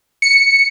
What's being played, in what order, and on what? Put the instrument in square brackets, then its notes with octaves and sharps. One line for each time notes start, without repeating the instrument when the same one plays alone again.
[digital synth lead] C#7